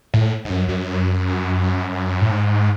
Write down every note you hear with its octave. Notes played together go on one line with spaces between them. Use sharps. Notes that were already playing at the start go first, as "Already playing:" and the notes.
A2
G#2
F#2
F#2
A2
G#2